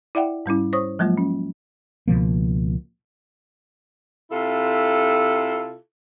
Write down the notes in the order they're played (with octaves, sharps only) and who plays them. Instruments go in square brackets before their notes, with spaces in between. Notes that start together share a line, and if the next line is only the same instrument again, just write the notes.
[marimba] E4 D5 E5 F#5 G5
G#2 G3 C#4 E4
C5 C#5 C#6 D#6
F3 F#3 G#3 A#3 F4
C#4
[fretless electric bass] C#2 B2 F3 A#3
[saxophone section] C3 E4 F4 A4